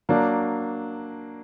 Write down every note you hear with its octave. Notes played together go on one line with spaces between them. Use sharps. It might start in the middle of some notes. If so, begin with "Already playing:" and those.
F#3 A#3 D4